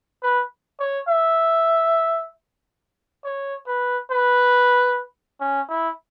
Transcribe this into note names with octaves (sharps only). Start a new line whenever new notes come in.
B4
C#5
E5
C#5
B4
B4
C#4
E4